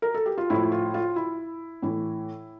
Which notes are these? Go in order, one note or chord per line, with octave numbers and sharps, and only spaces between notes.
A#4
A4
G4
F4
A2 F3 E4
F4
F4
E4
A2 E3